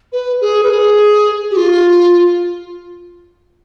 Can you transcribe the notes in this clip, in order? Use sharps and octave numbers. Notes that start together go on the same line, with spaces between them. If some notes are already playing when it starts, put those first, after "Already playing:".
B4
G#4
B4
G#4
G4
F4